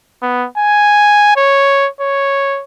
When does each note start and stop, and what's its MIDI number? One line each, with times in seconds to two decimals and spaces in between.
0.22 0.47 59
0.58 1.32 80
1.36 1.88 73
2.01 2.63 73